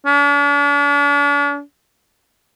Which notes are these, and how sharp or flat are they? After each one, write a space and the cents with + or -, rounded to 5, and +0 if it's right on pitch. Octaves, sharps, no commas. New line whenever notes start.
D4 -45